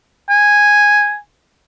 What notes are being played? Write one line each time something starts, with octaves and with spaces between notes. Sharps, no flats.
G#5